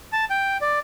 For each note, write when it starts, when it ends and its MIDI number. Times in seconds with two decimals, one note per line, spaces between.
0.13 0.25 81
0.30 0.57 79
0.61 0.79 74